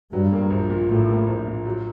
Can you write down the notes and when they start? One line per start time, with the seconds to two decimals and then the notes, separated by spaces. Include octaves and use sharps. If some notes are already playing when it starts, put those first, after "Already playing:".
0.12 G2 F#3
0.32 A#3
0.50 A#1
0.70 A#2
0.88 A2 F#3
1.08 A#3
1.27 A#1
1.47 A#2
1.66 F#3